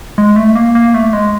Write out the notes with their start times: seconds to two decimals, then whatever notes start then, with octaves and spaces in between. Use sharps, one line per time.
0.18 G#3
0.36 A3
0.55 A#3
0.75 A#3
0.94 A3
1.13 G#3